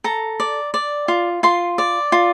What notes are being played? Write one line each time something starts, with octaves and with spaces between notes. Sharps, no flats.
A4 A#5
D5
D5
F4
F4 C6
D5
F4